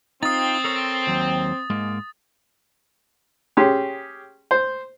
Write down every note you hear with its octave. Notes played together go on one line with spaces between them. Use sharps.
C4 D#4 F4 D#6 A6
A4 A#4 C#5
D#2 F#3
G#2 G#3 A#3
C#4 G4 G#4 C6
C5